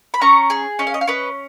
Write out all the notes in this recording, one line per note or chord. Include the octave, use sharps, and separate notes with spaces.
B5
C#4 A#5 C#6
G#4
C#4 D#5
F5
D#5
F5
C#4 B4 D#5